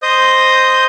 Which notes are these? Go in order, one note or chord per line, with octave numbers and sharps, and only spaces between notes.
C5 D#5 D#6 G6